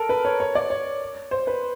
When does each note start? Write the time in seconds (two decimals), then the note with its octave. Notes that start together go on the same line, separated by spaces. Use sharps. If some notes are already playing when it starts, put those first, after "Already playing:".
Already playing: A4 A#4
0.09 B4
0.25 C#5
0.40 C#5
0.55 D5
0.70 C#5
1.31 C5
1.47 B4